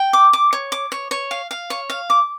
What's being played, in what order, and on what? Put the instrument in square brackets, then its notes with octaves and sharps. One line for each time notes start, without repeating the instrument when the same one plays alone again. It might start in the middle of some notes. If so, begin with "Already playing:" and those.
Already playing: [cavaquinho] G5
D6
D6
C#5
D6
C#5
C#5
F5
F5
C#5
F5
D6